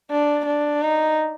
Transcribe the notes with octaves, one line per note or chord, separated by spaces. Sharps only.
D4
D4
D#4